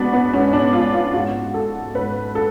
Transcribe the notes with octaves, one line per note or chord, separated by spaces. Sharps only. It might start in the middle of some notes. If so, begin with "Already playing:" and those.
Already playing: G#2 B3 D4 F#4
B3
G#2 C#4
D4
F4
F4
G#2 F#4
A4
G#2 B4
A4